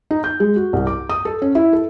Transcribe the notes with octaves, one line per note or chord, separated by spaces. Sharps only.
D#4
G6
G#3
F#4
C2
D6
D#6
A4
C#4
E4
A4